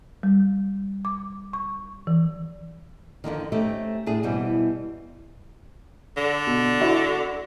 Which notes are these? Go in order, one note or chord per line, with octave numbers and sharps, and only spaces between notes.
G3
D6
C#6
E3
F2 G#2 D3 D#3
A3 C4 C#4 D#4 G4
A2 D4 G#4
E2 B2 E3 G3 C4
D3
B2
E4 F#4